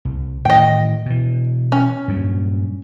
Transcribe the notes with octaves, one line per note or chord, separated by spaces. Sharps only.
C2
A2 D#3 E3 D#5 G5
B2 E3
C#4
G2 A#2 F#3